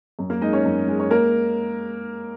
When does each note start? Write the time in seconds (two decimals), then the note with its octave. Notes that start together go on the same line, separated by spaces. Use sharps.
0.19 F#2
0.30 A#3 A#4
0.41 G#3 D#4 D#5
0.53 C#4 C#5
0.64 F#2
0.88 G#3
1.00 C#5
1.11 A#3 A#4